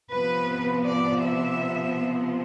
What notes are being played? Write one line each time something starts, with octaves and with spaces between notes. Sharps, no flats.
C3 F3 B3 B4
D5
E5